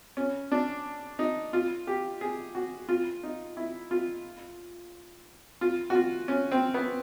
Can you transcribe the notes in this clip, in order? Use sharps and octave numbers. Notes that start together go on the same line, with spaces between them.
C#4
D4
D#4
F4
G4
G#4
F#4
F4
D#4
E4
F4
F4
F#4
F4
C#4
C4
B3